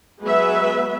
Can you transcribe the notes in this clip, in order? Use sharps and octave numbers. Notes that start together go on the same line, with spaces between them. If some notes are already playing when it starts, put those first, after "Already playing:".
F#3 G#3 B3 G#4 B4 E5